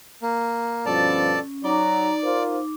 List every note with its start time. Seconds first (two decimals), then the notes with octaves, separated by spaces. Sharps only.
0.22 A#3
0.86 G2 B2 F3 C#4 A4 D5 A5
1.64 F#3 D#4 D5 A#5 D6
2.23 F4 A#4 C5